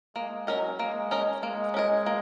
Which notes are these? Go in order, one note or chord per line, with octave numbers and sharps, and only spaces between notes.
G#3 A#3
F#3 C#4 A#4 D#5
G#3 A#3
C#4 A#4 D#5
G#3 A#3
C#4 A#4 D#5
A#3